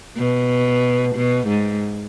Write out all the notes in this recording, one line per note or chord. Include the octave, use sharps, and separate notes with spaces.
B2
B2
G#2